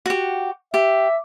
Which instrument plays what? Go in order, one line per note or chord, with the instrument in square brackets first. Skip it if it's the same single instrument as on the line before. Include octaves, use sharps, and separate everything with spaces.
[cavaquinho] F#4 G4
[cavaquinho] G4 [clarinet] E5